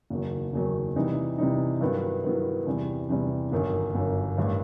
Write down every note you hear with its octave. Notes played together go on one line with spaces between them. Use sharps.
F#1 E2 D#3 F#3
F#1 E2 D#3 F#3
C3 E3 G3 D#4
C3 E3 G3 D#4
G2 D#3 F#3 B3 E4
G2 D#3 F#3 B3 E4
E2 C3 E3 G3
E2 C3 E3 G3
G1 F#2 D#3
G1 F#2 D#3
A1 G2 D#3